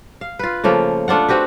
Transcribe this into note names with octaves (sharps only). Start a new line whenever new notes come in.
F5
F4 B4
C#3 F3 A3 A#3
A3 D4 F4 F#5
C4 F#4 G4 B4